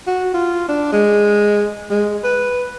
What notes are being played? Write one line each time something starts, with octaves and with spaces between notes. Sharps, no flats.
F#4
F4
D4
G#3
G#3
B4